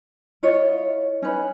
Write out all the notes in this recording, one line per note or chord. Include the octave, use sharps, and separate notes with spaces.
E4 F4 C#5 D#5
C#4 D#4 B4